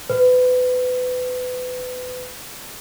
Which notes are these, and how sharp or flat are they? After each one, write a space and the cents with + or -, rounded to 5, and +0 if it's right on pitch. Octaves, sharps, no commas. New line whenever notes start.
B4 +30